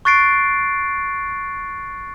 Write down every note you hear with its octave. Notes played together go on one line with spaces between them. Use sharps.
C#6 F#6 A6 C7 D7